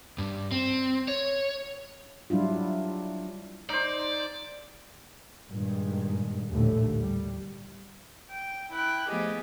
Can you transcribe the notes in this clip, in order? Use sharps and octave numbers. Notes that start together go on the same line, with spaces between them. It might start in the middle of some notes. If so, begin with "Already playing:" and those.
G2
C4
C#5
F#3 G3 D4 E4 F4
D#4 C5 D5
G2 A#2 D#3 G#3
A#1 D#2 A2 D3 A3
G3
G5
E4 G5 F#6
F3 A3 B3 G4 G#4 D#5